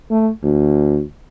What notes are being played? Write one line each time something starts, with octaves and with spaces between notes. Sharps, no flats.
A3
D2